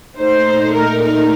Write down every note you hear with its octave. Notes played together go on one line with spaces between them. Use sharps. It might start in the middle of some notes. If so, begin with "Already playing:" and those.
A#2 A3 D#4 C5
A#4
A#4